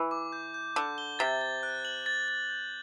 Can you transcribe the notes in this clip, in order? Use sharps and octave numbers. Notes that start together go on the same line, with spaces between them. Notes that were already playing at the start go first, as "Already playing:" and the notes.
Already playing: E3
D6
G6
G6
D3 D6
G7
C3 A6
A6
F#6
F#7
A6
A6
G6